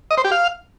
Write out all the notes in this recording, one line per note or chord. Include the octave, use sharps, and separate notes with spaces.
D#5
C5
G4
F5